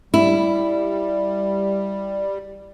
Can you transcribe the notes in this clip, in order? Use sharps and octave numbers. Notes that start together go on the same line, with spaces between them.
G3 E4